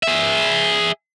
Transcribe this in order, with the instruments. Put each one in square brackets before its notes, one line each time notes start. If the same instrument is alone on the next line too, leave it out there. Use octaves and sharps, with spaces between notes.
[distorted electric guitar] G#4 E5